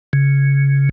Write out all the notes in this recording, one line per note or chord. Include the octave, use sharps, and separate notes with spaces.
C#3